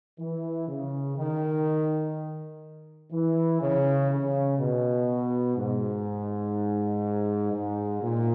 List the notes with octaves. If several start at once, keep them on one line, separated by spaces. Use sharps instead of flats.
E3
C#3
D#3
E3
C#3
C#3
B2
G#2
G#2
A#2